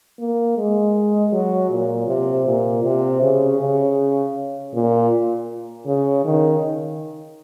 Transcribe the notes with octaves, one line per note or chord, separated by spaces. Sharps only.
A#3
G#3
F#3
A#2
C3
A#2
C3
C#3
C#3
A#2
C#3
D#3